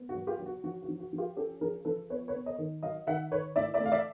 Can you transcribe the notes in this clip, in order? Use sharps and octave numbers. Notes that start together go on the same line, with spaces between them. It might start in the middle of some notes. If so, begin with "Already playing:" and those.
Already playing: B3
F#4
F#3
F4 G4
F#3
F#4
F3 F#4
F#4
F3
F#4
F3
F4 G4
C#4 G4 A4
F3 G#4 A#4
F3 A4 B4
B3 B4 C#5
B4 C#5
B3
C#5 D#5
D#3
F#3 D#5 F5
D#3 E5 F#5
D#3 B4 C#5
A2 D5 E5
D5 E5
A3
F5
D5 E5